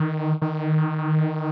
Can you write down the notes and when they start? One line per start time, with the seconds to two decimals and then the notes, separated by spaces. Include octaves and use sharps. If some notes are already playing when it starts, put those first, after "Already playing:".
Already playing: D#3
0.42 D#3